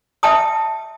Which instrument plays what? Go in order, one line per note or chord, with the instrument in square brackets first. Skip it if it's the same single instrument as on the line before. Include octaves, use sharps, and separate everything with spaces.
[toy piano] E5 G5 A5 D#6